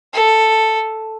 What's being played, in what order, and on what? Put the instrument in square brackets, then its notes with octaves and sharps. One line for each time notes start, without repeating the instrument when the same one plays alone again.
[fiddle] A4